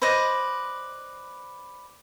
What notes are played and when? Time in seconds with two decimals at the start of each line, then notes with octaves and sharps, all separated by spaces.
0.02 B4 C5 D5 D#5